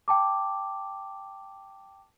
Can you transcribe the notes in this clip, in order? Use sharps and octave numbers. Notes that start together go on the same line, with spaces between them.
G5 A5 D6